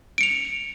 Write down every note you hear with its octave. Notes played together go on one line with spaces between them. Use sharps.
C#7 D7 F7